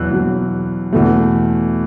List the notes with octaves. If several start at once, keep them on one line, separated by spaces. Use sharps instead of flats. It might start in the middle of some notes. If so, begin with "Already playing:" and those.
Already playing: E2 B2 F#3 E6 F#6
E2 B2 F#3
E2 B2 A3